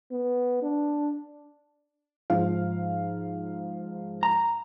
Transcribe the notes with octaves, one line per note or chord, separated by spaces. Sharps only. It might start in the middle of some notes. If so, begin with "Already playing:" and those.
B3
D4
G#2 F3 F5
A#5